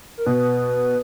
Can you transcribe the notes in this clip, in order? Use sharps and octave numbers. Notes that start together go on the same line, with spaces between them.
A#4
B2 B4